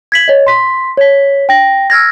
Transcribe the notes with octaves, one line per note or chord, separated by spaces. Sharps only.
G#6 B6 F#7
C#5 D#5
C6 B6
C#5 B6
G5 A#6
E6 F6 G#6 A#6